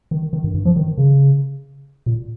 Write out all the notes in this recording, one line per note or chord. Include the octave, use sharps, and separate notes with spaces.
D#3
D#3
G2
G2
F3
D#3
C#3
A#2